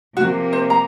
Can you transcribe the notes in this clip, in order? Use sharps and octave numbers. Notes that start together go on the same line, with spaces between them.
C3 F3 A#3 F#4
C5
A#5